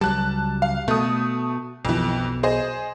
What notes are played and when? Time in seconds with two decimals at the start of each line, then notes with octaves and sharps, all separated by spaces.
0.01 C#2 F#3 G3 A5 F#6
0.62 F5
0.88 B2 A3 D#6
1.85 B1 F2 B2 E3
2.43 G#4 C5 D#5